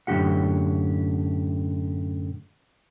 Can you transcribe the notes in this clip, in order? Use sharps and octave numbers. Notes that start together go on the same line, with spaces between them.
F#2 A2 D3 F#4 G4 F#5